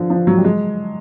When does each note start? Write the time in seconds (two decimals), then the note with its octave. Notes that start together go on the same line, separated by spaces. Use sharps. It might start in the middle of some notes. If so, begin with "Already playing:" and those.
Already playing: D3 E3 F3
0.10 F3
0.27 F#3
0.38 G3
0.44 G#3